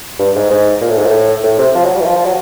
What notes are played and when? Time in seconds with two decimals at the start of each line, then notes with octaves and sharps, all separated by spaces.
0.19 G2
0.35 G#2
0.50 G#2
0.81 A#2
0.89 A2
0.98 G#2
1.06 A2
1.44 A2
1.59 C3
1.75 F3
1.85 F#3
1.95 G3
2.00 E3
2.05 F3
2.16 F3
2.25 F#3